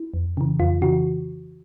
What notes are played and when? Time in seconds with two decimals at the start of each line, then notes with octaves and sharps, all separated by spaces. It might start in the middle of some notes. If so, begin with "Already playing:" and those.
Already playing: E4
0.14 F2
0.37 C#3 E3
0.59 F2 F4
0.82 C#3 E3 F#4